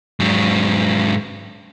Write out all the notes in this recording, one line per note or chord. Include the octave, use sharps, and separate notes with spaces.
G#2 F#3